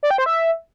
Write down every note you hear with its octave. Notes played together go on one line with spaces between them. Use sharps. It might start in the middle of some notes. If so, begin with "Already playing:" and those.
D5
G5
C5
E5